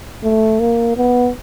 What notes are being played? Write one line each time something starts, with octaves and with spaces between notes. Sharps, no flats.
A3
A#3
B3